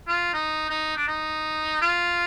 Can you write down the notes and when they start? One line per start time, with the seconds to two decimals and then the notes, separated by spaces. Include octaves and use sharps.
0.08 F4
0.34 D#4
0.70 D#4
0.97 D4
1.08 D#4
1.82 F4